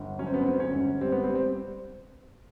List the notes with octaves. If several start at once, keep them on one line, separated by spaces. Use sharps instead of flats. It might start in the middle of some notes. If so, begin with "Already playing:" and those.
Already playing: G1
F#3 C#4
C4
B3
C4
D3
C4
C#4
G1
G3 C4
B3
C4
G3
C4